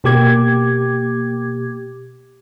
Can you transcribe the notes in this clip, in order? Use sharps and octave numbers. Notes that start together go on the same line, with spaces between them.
B2 A#3 G4 D6 G#6